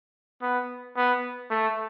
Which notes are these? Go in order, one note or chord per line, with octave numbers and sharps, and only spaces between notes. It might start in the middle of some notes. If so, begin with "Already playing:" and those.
B3
B3
A3